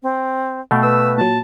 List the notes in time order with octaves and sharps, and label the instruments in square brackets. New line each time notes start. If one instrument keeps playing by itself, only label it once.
[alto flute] C4
[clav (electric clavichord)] B2 A3 [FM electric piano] F5 G5
[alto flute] B4 [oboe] E6
[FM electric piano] A#2 F#3 [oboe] A5